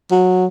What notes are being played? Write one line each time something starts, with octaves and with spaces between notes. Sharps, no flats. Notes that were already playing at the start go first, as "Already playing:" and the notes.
F#3